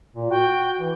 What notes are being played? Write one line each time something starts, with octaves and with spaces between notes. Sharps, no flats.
A#2
F#4 G5
E3